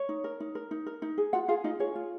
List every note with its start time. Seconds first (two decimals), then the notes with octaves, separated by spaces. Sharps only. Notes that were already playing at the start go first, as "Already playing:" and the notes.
Already playing: C#5
0.09 D#4
0.24 A#4
0.40 D#4
0.55 A#4
0.71 D#4
0.86 A#4
1.02 D#4
1.18 G#4
1.33 F4 F#4 F#5
1.48 F4 G#4 F5
1.64 D#4 F4 D#5
1.79 G#4 C#5
1.95 F4